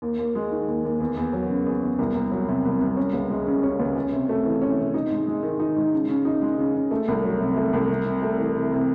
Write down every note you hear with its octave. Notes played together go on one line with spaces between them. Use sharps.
D#2
D#2
G#3
D#3
D#2
D#2
E2
E2
F#3
C#3
E2
E2
C2
C2
F#3
C3
C2
C2
C#4
C#2
G#3
C#3
C#4
C#2
C#4
C3
A3
E3
C#4
C3
D#4
G#2
G#3
D#3
D#4
G#2
C#3
C#3
D#4
G#3
C#3
C#3
A3
C2
F#3
C3
A3
C2
C3
C3
A3
E3
C3
C3